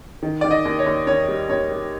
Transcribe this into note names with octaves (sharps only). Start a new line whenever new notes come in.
D#3
D#3 D5
D#5
D#2
C#5
D#2
D#2 C#5
G3
D#2 C#5
G3